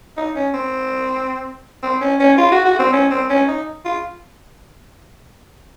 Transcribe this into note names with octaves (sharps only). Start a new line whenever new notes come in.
D#4
C#4
C4
C4
C#4
C#4
F4
F#4
F#4
C4
C#4
C4
C#4
D#4
F4